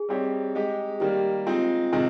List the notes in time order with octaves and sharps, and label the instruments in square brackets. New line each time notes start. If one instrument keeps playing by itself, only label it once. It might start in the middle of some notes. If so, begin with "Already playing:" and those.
Already playing: [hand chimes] G#4
[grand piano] G3 C4 D#4 G4 C#5
G#3 D#4 G4
[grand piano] D#3 G3 A#3 [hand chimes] G4
[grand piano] G#3 C4 D#4 [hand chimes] F4
[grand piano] C3 D#3 G#3 C4